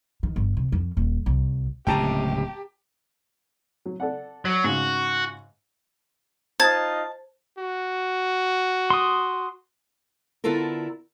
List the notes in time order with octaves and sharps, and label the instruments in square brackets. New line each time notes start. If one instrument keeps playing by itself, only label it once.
[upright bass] D#3
G1
C3
F2
D#1
C2
[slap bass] D1 C#2 C3 [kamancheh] G4 [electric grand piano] G5 A5 A#5
[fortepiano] F#3
A4 D5 F#5
[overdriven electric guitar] F#3
[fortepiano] G#2 C#3 [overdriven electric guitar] F#4
[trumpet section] D#4 F4 D#5 [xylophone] C5 G#6 [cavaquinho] A5
[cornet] F#4
[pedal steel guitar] C6 D#6
[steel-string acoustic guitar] D3 B3 E4 F4 A4 A#4